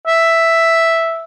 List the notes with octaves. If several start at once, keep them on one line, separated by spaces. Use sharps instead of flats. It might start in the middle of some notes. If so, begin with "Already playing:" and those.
E5